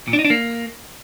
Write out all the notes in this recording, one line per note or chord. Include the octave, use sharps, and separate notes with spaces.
A#2
D4
D#4
D4
A#3